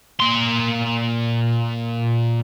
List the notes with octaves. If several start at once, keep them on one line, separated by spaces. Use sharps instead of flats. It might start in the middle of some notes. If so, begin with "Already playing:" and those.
A#2 C6